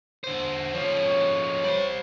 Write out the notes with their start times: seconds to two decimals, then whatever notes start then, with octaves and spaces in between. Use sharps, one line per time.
0.24 D3 C5
0.74 F3 C#4 C#5
1.64 G3 C5